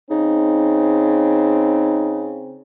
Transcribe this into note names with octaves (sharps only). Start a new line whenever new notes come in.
C#3 C4 D#4